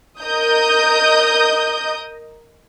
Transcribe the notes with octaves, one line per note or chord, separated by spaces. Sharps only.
A#4 D#5 D#6 G6